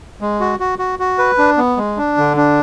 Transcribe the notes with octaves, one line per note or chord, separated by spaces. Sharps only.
G#3
F#4
F#4
F#4
F#4
B4
D4
B3
G#3
D4
D3
D4